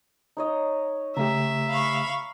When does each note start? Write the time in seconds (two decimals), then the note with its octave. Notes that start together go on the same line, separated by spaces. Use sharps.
0.37 D#4 C#5 D#5
1.17 C#3 A3 G4 E5 A#5 E6
1.69 F5 B5 C#6